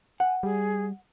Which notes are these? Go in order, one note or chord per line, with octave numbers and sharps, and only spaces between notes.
F#5 G#5
G3 G#4